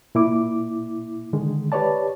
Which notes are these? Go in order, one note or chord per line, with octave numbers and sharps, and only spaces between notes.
A#2 E4 D6
D3 D#3 G#3
G4 B4 C#5 D5 A5